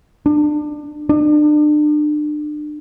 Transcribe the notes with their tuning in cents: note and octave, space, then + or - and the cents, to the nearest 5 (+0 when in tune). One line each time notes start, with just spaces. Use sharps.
D4 +25
D4 +35